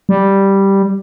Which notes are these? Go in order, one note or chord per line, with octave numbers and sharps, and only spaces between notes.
G3